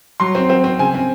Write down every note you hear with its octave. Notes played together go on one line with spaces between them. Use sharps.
F#3 C6
C4
C4
C4
C#3 G#5
C4